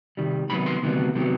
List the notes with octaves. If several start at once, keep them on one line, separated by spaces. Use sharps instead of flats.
C3 D#3 G3
D2 C3 D#3 F#3 B3 B5
C6
D2 C3 D#3 F#3 B3
C3 D#3 F#3 B3